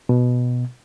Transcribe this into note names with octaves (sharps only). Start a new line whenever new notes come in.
B2